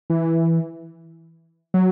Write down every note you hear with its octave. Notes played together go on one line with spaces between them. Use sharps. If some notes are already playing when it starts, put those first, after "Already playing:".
E3
F#3